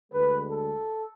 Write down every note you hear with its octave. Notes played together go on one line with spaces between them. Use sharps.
D2 D3 G#3 B4
A4